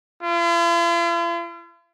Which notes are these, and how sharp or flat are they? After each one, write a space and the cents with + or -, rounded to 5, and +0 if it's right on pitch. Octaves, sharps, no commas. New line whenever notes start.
F4 -45